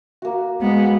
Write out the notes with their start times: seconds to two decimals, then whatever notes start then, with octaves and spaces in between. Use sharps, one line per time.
0.22 A#3 F#4
0.62 G#3 B3